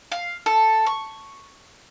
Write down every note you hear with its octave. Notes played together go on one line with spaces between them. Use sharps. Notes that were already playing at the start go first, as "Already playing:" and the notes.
F5
A4
C#6